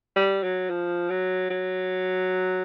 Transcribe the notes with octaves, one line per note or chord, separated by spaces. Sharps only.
G3
F#3
F3
F#3
F#3